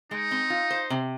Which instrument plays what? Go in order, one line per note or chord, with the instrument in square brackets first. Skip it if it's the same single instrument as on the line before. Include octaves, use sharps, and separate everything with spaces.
[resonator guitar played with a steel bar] G#3 [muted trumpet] D#4
[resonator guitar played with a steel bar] C4
F4
C5
C3